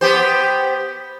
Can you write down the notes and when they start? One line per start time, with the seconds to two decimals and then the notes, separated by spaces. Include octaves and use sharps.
0.01 B3 G4 C5